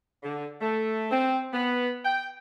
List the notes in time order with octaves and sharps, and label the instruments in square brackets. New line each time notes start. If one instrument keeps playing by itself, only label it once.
[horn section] D3
A3
C4
B3
G5